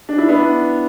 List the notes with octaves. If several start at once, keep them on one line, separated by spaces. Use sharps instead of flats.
D4
E4
B3 D4